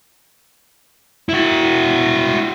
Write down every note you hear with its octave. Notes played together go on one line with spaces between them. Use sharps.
E4 F#4